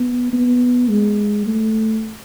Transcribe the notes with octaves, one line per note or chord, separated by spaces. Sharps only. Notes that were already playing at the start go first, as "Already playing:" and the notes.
Already playing: B3
B3
G#3
A3